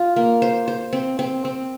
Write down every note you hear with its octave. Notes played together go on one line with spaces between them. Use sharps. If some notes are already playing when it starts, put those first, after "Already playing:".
Already playing: F4
A#3
C5
C5
C4
C4
C4